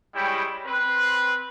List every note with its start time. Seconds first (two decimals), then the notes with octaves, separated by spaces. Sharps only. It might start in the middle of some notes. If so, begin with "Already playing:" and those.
0.15 G3 G#3 E4 C#5 G5 B5
0.66 C4 B4 C6